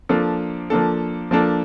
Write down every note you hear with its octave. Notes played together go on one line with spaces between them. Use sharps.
F3 A#3 D4 A4
F3 A#3 D4 A4
F3 A#3 D4 A4